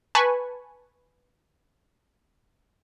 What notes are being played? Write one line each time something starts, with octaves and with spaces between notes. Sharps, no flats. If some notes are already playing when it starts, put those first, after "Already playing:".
B4 G#5 A5 B5 C#6